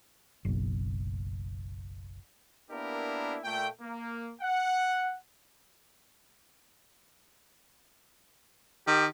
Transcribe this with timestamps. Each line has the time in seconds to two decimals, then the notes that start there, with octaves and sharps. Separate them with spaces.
0.45 F#1 B1
2.71 A#3 B3 D4 E4 G4 A#4
3.44 A#2 A3 G5
3.81 A#3
4.42 F#5
8.87 D#3 G4